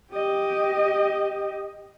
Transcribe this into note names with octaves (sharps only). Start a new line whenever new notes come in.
G4 D#5